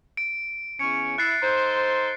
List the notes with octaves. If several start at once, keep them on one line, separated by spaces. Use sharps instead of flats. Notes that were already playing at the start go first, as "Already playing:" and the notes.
D7
E2 C#4 C#7
E4 F#6 A6 C7
D#4 A4 C5